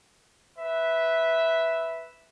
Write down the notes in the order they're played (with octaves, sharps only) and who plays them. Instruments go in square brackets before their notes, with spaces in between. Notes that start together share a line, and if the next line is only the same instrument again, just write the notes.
[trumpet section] B4 E5